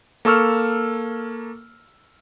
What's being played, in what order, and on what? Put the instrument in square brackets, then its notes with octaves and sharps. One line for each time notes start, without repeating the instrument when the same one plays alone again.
[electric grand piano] A#3 A4 C#6 E6 F6